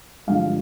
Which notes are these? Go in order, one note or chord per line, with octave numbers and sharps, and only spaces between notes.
G2 D3 F3 G#3 F5